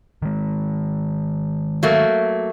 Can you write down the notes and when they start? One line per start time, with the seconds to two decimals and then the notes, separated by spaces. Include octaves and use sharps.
0.22 D#3 G#3
1.83 F#3 A3 A#3